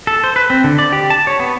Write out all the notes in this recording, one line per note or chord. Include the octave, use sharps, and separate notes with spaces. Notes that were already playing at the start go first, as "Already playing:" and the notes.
A4
C5
B4
C4
D3
D5
G4
A5
C#5
B3